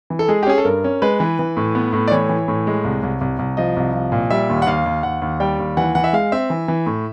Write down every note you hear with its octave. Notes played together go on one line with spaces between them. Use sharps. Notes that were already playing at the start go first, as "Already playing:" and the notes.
E3
A4
G#3 G#4
G4
C#4 G#4
A4
G2 A#4
C#4
G#3 B4
E3
E3
A2
B3
A2
D5
E3 C#5
E3
A2
G#3
C2
C2
C2
C2
F3 D#5
C2
F3
A#2
G3 E5
D#2
F#5
D#2 F5
D#2
D#2 F#5
D#2
G3 G5
D#2
E3 F#5
E3 F#5
E5
G#3 F5
C4 E5
E3
E3
A2